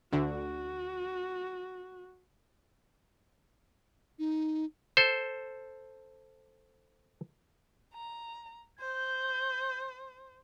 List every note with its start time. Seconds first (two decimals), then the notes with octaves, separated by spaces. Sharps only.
0.12 D2 D3 F#4
4.19 D#4
4.97 A4 C5
7.93 A#5
8.79 C5 G6